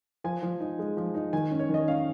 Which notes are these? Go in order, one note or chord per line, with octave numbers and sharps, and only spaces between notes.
F3 G#5
F3
D#4
G#3
F3
D#4
D#3 G#5
C#4
C#5
D#3 D#5
C#4 F5